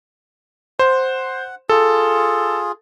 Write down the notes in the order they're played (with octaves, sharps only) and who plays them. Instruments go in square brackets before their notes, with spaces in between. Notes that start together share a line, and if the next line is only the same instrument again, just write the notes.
[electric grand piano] C5 [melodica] F#5
[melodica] F4 G#4 [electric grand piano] A4